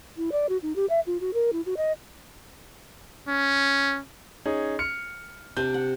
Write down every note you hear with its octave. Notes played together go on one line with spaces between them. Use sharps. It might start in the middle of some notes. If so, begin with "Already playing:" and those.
E4
D5
F#4
D#4
G4
E5
F4
F#4
A#4
E4
F#4
D#5
C#4
C#4 D#4 G#4
F6 C#7
C3 D4 G6
F#5